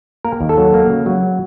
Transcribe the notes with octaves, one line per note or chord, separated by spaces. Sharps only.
A#3 A#4
D#2
A4
F#3
A#3
C#3
F#3